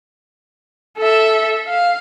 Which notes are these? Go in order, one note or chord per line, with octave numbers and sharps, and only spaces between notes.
A4 E5
F5